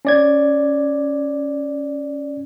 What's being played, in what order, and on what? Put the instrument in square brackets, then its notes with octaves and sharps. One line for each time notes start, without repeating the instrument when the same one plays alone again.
[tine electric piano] C#4 D5 G#6